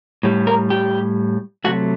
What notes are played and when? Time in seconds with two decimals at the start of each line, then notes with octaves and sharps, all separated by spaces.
0.23 A2 G3
0.47 A#4
0.70 G4
1.64 C3 F#3 A3 F#4